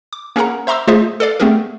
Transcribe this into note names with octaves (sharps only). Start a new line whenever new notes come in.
D6
A#3 C#4 G#4 A#4 F#5 A#5
C5 E5 A#5 C6 D6 E6
A3 F4 G#4 C5 D#5 E5
A4 B4 D5 F5
A3 B3 C4 G4 G#4 A#4